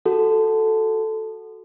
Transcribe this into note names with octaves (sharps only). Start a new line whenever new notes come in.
F#4 A4